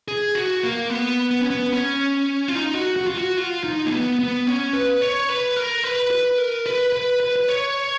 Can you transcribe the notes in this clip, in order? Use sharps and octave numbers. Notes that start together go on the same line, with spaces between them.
G#4
F#4
A#3
B3
B3
C#4
B3
C#4
F4
D#4
F#4
F#4
F4
F#4
F4
D#4
A#3
B3
B3
C#4
B4
C#5
B4
A#4
B4
B4
A#4
B4
B4
B4
B4
C#5